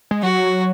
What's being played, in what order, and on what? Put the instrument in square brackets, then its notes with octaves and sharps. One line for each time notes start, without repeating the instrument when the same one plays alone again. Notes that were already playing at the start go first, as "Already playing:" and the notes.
[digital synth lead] G#3
[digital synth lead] F#3 [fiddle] F#4